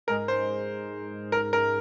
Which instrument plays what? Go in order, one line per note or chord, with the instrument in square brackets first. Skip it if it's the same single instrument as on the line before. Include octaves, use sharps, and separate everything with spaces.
[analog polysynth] G#2 G#3 D#4 G#4 [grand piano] A#4
[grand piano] C5
A#4
A#4